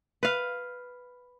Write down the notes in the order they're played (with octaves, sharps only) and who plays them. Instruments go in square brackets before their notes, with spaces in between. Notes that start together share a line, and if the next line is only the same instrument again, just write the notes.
[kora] B4 F5